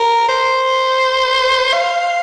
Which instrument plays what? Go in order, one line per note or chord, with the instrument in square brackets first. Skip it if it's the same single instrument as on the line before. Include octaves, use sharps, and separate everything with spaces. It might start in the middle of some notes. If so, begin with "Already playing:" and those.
Already playing: [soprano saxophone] A#4
C5
F5